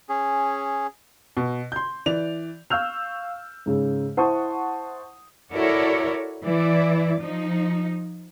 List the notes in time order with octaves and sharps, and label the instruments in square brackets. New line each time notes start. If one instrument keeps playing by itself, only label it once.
[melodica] C#4 G#4
[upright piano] B2
C6 G6
E3 D5 F7
F5 C#6 E6 F6 G6 F7
G#2 C#3
E4 C5 F#5 A5 C#6 D#6
[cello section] E4 F#4 A4 A#4 C#5 D5
E3 E4 D5
F3 D#4